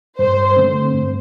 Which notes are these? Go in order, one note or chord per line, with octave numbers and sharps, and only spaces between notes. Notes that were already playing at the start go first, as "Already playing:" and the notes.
G2 C5
D3 A3 C4
G2